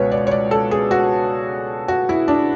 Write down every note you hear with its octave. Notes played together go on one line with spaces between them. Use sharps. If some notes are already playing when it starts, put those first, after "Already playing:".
Already playing: C#2 B2 B4 C#5
D5
C#5
D5
A4
G#4
F#4
F#4
E4
D4